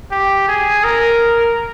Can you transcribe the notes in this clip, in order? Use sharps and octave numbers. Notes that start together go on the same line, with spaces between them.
G4
G#4
A#4